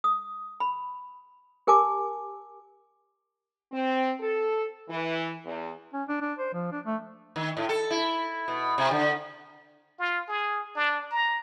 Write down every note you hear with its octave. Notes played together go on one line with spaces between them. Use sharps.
D#6
B5
G4 A#4 G#5 A5 D6
C4
A4
E3
E2
C#4
D4
D4
C5
F3
D4
A3
D#3
A2
A4
E4
B2
C3
D3
F4
G#4
D4
A#5